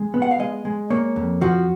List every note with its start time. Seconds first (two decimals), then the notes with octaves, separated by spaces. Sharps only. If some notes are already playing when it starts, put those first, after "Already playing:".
Already playing: G#3
0.14 B3
0.22 F#5
0.31 F5
0.39 G#3 D#5
0.65 G#3
0.90 A#3 C#5
1.16 F2
1.41 F3 F#4